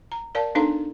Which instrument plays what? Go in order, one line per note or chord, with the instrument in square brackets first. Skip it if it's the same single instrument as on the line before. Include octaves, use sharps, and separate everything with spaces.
[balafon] A#5
A#4 D5 F5 A5
B3 D4 D#4 A4 F5 A#5